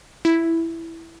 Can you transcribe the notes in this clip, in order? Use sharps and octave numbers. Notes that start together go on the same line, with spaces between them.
E4